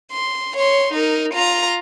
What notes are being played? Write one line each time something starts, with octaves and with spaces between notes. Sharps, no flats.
C6
C#5 C6
D#4 A#4
F4 A#5